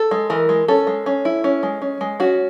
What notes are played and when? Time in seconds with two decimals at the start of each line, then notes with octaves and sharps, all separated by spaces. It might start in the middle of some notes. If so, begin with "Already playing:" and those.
Already playing: A4
0.11 G#3
0.30 E3 A#4
0.49 G#3
0.68 C#4 A4
0.87 G#3
1.06 C#4
1.25 E4
1.44 C#4
1.63 G#3
1.82 C#4
2.01 G#3
2.20 C#4 F#4